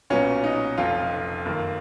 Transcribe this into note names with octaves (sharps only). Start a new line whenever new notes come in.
B1 A#2 F#3 B3 C#4
D#4
F1 F2 F3 F4
F#2 D#3 A#3